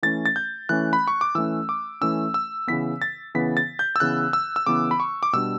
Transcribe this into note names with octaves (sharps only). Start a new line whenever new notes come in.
E3 A3 C#4 A6
A6
G6
E3 A3 C#4 F#6
B5
C#6
D6
E3 A3 C#4 E6
D6
E3 A3 C#4 E6
E6
C#3 E3 B3 B6
A6
C#3 E3 B3 B6
A6
G6
E6
C#3 E3 B3 F#6
E6
E6
C#3 E3 B3 D6
B5
C#6
D6
B2 G3 D4 E6